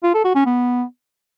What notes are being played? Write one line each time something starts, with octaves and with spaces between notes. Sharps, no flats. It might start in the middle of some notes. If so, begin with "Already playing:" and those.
F4
A4
F#4
C#4
B3